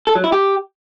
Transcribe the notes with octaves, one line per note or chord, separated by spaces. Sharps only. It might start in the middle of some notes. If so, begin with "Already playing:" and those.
A4
F#3
E4
G4